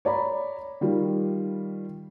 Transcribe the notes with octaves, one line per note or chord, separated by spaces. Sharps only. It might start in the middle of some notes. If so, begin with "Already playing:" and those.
C#5 D5 A#5 B5
D#3 G3 F4